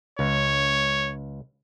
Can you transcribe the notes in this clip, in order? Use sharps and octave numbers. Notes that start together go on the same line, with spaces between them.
C#2 C#5